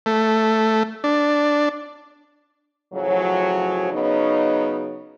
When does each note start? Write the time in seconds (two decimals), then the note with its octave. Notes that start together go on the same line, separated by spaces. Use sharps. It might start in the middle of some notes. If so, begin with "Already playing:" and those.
0.06 A3
1.04 D4
2.93 A2 C#3 F3 F#3
3.91 C#3 F#3 B3 C#4 D#4